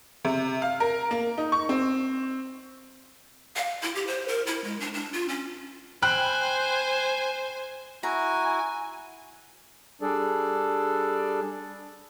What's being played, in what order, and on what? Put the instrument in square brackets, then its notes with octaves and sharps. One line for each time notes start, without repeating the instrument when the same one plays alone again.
[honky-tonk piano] C3
F5
A#4
A#3
D#4
C#6
C4
[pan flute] F5
E4
G4
C5
A#4
E4
G#3
D4
D4
F4
C#4
[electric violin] C5 G#5 [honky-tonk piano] G5 B5 F#6
[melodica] E4 F#4 [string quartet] G#5 [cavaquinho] A#5
[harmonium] G3 D4 G#4 A4 D5